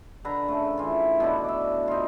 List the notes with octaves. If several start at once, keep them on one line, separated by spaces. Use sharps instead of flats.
D3 B4 A#5
C#3 A3
E3 F4
B2 D4 E4
D5 E5
D#4 F4